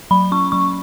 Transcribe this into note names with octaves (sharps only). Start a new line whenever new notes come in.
F#3 B5
C#4 C#6
F#3 C#6